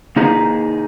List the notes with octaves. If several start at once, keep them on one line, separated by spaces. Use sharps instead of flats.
A#3 D#4 G#4